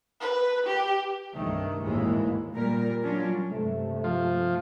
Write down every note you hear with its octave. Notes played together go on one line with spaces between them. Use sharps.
B4
G4
C2 G2 D#3 A3
G#1 D#2 A2 E3 G#3 A#3
A#2 G3 A#4
F#3 C#4 D4 F4
G2 C3 A3
F3